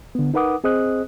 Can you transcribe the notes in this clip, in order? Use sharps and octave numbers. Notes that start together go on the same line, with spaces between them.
D3 B3
D#4 A#4 B4 F#5 D6 D#6
C4 G#4 C5 D#5 D#6 F#6